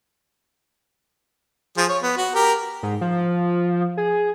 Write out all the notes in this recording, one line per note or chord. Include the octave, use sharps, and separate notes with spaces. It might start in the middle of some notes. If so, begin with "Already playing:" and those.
F3 G#4
C#5
B3
F#4
G4 A#4
G#2
F3
G#4